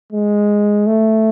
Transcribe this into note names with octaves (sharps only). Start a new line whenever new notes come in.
G#3
A3